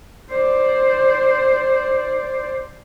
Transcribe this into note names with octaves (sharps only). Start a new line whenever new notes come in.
C5 D5